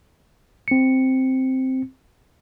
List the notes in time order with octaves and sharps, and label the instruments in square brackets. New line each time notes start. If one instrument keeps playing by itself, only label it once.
[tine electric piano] C4 C#7